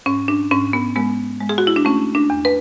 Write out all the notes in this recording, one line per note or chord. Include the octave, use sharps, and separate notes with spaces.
G#2 C#4
D4
G#2 C#4
B3
G#3 B3
G#3
G#4
F#4
E4
D4
A3 C#4
D4
E2
B4